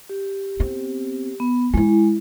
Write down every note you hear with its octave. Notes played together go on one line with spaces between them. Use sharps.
G4
B3 C4
B3
G#3 E4 F4